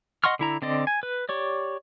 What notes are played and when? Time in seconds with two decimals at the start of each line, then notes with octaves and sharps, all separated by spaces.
0.24 D#5 F#5 C6 C#6 F6
0.39 D3 E4 A#5
0.62 D3 C4 D5 D#5
0.87 G#5
1.03 B4
1.29 G4 C#5 D5